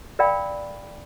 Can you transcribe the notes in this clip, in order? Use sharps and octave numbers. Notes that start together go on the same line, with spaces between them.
A#4 D5 F5 G5 B5